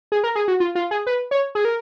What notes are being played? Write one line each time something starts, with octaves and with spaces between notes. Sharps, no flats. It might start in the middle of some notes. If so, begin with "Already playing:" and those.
G#4
A#4
G#4
F#4
F4
F4
G#4
B4
C#5
G#4
A#4